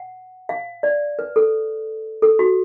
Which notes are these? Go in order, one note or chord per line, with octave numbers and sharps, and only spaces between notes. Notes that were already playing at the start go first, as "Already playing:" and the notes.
Already playing: F#5
F5
D5
B4
A4
A4
F#4